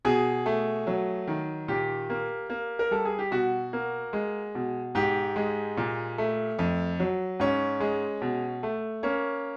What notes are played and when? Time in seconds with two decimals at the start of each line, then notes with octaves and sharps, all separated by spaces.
0.05 B2 G#4
0.46 A3
0.87 F#3
1.27 D#3
1.68 A#2 G4
2.10 A#3
2.50 A#3
2.79 A#4
2.91 G3 A4
3.05 G#4
3.19 G4
3.31 B2 F#4
3.73 A#3
4.13 G#3
4.55 B2
4.95 G#2 G4
5.36 G#3
5.77 A#2
6.18 A3
6.59 F2
7.00 F#3
7.40 G#2 C#4
7.80 G#3
8.21 B2
8.63 A3
9.03 A#3 C#4